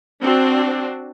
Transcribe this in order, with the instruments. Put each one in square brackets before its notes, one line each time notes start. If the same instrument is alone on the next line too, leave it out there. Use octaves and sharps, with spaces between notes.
[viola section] C4 D4 F#4